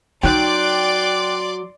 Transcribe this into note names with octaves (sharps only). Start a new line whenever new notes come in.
F#3 D#4 D5 G5 C6 D6 F#6